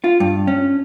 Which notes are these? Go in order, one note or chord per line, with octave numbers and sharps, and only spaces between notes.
F4
G2
C#4